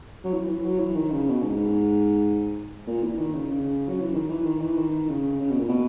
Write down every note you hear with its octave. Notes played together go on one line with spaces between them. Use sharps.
F#3
E3
E3
F#3
E3
D#3
C#3
B2
G#2
A#2
E3
D#3
C#3
C#3
F#3
E3
D#3
E3
D#3
E3
D#3
C#3
C#3
B2
A#2
B2